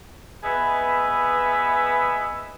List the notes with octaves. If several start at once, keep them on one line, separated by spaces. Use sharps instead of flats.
B3 G#4 B4 D#5 E5